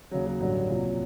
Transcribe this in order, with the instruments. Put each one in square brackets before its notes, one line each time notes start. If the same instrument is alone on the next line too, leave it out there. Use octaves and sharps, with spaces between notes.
[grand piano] D#2 C#3 F#3
F#3
A1 G2 D3 F#3
C2 A#2 F3